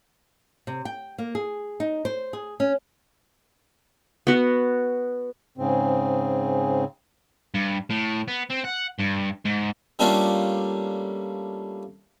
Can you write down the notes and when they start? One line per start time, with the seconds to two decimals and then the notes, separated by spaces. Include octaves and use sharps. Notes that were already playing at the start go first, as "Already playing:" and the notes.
0.67 C3
0.85 G5
1.18 A#3
1.35 G#4
1.80 D#4
2.05 C5
2.33 G#4
2.60 C#4
4.27 B3 F#4
5.58 G#2 C#3 C4
7.55 G2
7.90 A2
8.28 B3
8.50 C4
8.64 F#5
8.99 G2
9.45 G#2
9.99 G3 A3 A#3 C#4 D4 F4